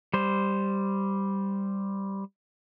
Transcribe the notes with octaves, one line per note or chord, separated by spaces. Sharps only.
G3 C5